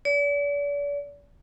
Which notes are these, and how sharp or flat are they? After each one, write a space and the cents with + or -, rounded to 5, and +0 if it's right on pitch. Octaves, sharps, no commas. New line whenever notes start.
D5 -40